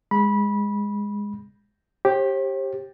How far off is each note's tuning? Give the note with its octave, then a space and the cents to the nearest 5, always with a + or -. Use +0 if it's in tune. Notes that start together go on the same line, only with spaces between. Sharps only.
G#3 -15 B5 -20
G4 +0 C5 +45